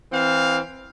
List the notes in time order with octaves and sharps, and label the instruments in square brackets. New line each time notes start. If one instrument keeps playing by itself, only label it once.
[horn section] E3 C4 F5